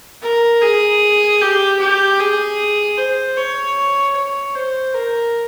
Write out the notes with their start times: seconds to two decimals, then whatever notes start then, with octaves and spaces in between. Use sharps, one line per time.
0.23 A#4
0.62 G#4
1.41 G4
1.79 G4
2.20 G#4
2.98 C5
3.37 C#5
4.16 C#5
4.55 C5
4.94 A#4